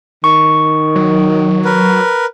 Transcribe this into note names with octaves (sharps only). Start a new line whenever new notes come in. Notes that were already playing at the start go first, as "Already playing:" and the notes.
D#3 C#6
F#3
A#4 B4